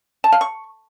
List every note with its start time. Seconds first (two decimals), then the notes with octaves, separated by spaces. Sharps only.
0.24 A5
0.32 F5
0.41 C#6